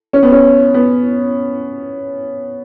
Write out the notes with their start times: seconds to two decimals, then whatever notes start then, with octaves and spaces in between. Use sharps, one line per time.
0.13 C#4
0.23 B3
0.32 C#4
0.74 B3